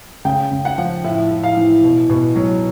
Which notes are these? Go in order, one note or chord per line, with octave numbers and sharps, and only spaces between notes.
C#3 G5
C#3
F#5
F3
A2 E5
A2
F5
E3
B2
B2
F#3